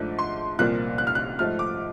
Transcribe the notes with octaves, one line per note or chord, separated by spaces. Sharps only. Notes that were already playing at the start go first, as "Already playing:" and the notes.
Already playing: G#2 F3 A3 D4
C6
C2 A#2 F3 A#3 F#6
F#6
F6
F#6
G#2 F3 A3 F6
D6